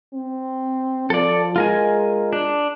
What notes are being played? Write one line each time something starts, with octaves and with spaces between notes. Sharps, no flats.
C4
F3 A4 D5
G#3 F4 A#4 G#5
D4